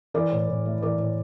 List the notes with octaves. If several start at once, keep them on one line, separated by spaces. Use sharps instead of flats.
E3 A#4 D5
A2
A2
A3
E3 A#4 D5
A2